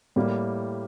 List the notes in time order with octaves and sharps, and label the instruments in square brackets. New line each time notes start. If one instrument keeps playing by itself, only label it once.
[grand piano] A2 G3 A#3